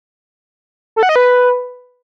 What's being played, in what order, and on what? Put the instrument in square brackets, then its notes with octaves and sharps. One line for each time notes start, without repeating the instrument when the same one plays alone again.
[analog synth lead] A4
F#5
D#5
B4